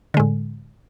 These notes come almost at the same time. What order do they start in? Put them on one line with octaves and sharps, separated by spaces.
D3 G#3 A2